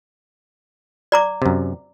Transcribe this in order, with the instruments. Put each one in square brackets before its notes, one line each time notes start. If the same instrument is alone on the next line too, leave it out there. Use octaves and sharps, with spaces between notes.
[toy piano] D5 A#5 D6
[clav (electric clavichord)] F#2 C3